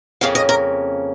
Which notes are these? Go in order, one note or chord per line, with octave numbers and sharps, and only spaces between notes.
F2 C#3 A#3 C#4 F5
D#5
A#4